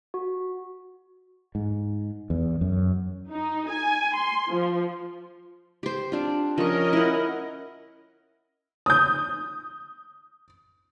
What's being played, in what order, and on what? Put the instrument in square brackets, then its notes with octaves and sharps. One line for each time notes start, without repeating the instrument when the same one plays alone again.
[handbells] F#4
[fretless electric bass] G#2
E2
F#2
[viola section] D#4
G#5
C6
F3
[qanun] G4 C5
C4 D4 F4
[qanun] F3 C#6 [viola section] C#4 A#4 D#5
[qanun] E4 F#5
[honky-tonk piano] D#6 G6